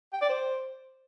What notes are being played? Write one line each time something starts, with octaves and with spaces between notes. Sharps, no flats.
G5
D5
C5